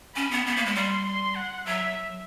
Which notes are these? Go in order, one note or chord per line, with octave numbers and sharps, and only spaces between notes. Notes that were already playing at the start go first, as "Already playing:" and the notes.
C#4 B5
B3
B3 B5
A#3
G#3
G3 C6
C6
F#5
F#3 E5